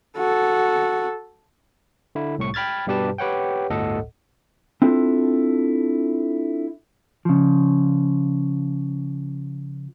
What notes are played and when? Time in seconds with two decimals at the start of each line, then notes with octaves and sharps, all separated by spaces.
0.18 F#4 A4
2.15 D3 E4
2.38 C2 A2 C#6
2.54 G5 B5 F6 G#6 A6
2.87 G2 B2 G3 G4 B4 A5
3.18 G4 B4 C#5 F#5 G5
3.70 G1 D2 A2 A4 D#5 F#5
4.82 C4 D4 E4 F4 A4
7.25 C#3 F3